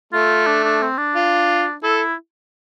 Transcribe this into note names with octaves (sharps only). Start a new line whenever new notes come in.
A3 F4
D4
D4
C4
D4
F4
E4 A4